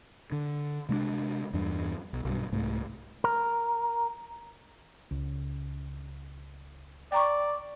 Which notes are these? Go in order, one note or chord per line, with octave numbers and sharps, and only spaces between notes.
D3
C3 G#3 A3 D4
E2 G2 D4
B1
B1 G2
C2 G#2 A3
A#4
C#2
D5 G5 A#5 C#6